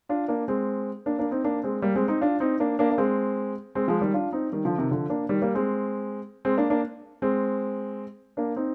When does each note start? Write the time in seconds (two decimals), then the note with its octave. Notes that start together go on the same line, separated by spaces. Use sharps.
0.09 D4 F4
0.28 A#3 D4
0.48 G#3 C4
1.06 A#3 D4
1.19 A#3 D4
1.31 C4 D#4
1.44 A#3 D4
1.63 G#3 C4
1.82 G3 A#3
1.95 G#3 C4
2.08 C4 D#4
2.21 D4 F4
2.40 C4 D#4
2.60 A#3 D4
2.79 A#3 D4
2.91 A#3
2.98 G#3 C4
3.75 G#3 C4
3.88 F3 G#3
4.01 D#3 G3
4.14 D4 F4
4.33 C4 D#4
4.52 D#3 G3
4.65 D3 F3
4.78 C3 D#3
4.91 D3 F3
5.10 A#3 D4
5.29 D#3 G3
5.42 G3 A#3
5.55 G#3 C4
6.45 G#3 C4
6.57 A#3 D4
6.70 A#3 D4
7.22 G#3 C4
8.37 A#3 D4
8.56 C4 D#4